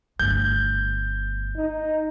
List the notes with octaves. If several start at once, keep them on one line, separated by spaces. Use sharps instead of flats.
G1 A3 G6
D#4